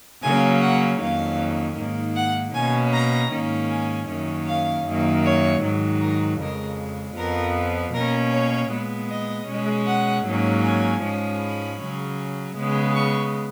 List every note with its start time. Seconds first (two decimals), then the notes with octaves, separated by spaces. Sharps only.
0.23 C#3 F#3 A#3 C#4 G#5
0.61 F#5
1.00 F2 D#3 F#3 A#3 C#4 F5
1.76 G#2 D#3 A#3
2.16 F#5
2.54 B2 A#3 C#4 G#5
2.93 A#5
3.31 G#2 D#3 A#3 C#4
3.69 G#5
4.08 F#2 D#3 A#3 C#4
4.46 F5
4.86 F#2 D#3 A#3
5.24 C#5
5.63 G#2 D#3 F#3
6.01 A#4
6.40 F2 C#3 G#3 A#4
7.17 F2 F3 B3 A#4
7.93 B2 A#3 C#4 A#4
8.32 C#5
8.71 A#2 G#3 B3
9.09 D#5
9.48 B2 G#3 C#4
9.87 F#5
10.26 G#2 F#3 A#3 C#4
10.64 G#5
11.03 G#2 F3 G#3 C#4
11.41 B5
11.79 C#3 F#3 C#4
12.57 C#3 G#3 B3
12.95 C#6